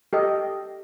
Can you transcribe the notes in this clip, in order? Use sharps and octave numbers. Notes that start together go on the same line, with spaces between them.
G4 A4 D#5